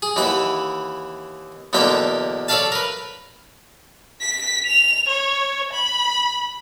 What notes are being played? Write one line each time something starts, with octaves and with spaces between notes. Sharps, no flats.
G#4
D#2 E3 E4 F#5
B1 E2 D3 A#3 E5 G5
A4 C#5 D5 E5 F5 A5
A#4 B4
B6
F7
C#5
B5